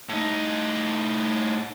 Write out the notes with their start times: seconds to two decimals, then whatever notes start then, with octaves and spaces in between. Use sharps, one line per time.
0.09 A2 D#4